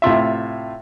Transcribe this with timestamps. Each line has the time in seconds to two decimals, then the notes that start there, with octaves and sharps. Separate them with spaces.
0.02 A2 C3 F4 E5